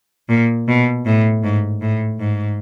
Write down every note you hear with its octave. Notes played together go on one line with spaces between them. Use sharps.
A#2
B2
A2
G#2
A2
G#2